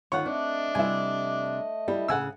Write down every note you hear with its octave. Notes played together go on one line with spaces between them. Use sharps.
D2 D#3 F4 C#5 F#5
A3 C4 D4 D#5
C3 G3 E4 G#5
G3 E4
A2 C#3 F#5 G#5 E6